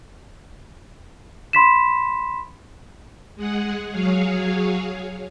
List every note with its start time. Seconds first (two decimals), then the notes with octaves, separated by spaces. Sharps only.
1.53 B5 C6 B6 E7
3.36 G#3 G#4 F#5
3.91 F#3 G#4 C#5 F5